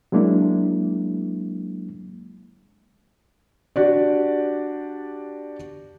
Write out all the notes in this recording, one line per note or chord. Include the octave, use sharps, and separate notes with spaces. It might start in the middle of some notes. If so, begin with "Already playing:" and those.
F#3 G#3 A#3 D4 E4
D4 F#4 G4 D5